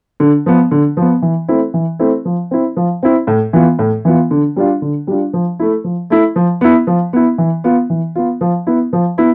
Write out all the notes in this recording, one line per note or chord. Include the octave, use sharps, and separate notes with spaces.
D3
F3 B3
D3
F3 B3
E3
A3 C4 E4
E3
A3 C4 E4
F3
C4 E4
F3
C4 E4
A2
E3 B3 F4
A2
E3 B3 F4
D3
G3 D4 F4
D3
G3 D4 F4
F3
A3 E4
F3
A3 E4
F3
B3 E4
F3
B3 E4
E3
B3 F4
E3
B3 F4
F3
B3 E4
F3
B3 E4